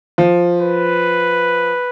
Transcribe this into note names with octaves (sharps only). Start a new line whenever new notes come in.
F3
B4